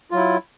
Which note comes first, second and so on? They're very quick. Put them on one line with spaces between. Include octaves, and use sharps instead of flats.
F4 F#3 E4